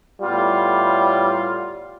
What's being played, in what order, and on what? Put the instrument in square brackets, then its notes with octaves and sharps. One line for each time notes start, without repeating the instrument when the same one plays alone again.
[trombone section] A2 G3 B3 F4